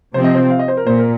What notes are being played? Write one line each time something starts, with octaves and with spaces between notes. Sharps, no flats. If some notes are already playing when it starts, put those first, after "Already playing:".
C3 F3 C4 C5
D#5
C5
F5
D#5
C5
A#4
A#2 C5
A#4